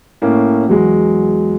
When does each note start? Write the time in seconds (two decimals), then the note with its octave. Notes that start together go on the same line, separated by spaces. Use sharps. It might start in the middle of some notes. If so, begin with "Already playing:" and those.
0.22 A2 A#3 C#4
0.68 E2 F#3 G#3